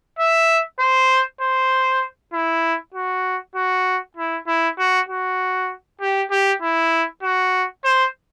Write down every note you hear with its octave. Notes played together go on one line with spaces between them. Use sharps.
E5
C5
C5
E4
F#4
F#4
E4
E4
F#4
F#4
G4
G4
E4
F#4
C5